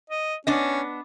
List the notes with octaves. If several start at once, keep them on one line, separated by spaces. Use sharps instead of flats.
D#5
B3 C#4 D4 D#5